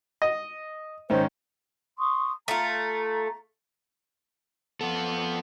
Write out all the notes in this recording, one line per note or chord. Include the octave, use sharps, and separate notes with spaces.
D#5
G#2 D#3 C#4 C5
C6 C#6 D#6
A3 F4 A#5
F3 B3 A4